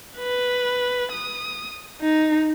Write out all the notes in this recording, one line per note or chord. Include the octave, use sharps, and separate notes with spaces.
B4
D#6
D#4